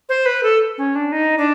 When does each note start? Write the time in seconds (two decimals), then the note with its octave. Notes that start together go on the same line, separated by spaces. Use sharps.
0.09 C5
0.26 B4
0.43 A4
0.78 C#4
0.95 D4
1.12 D#4
1.38 D4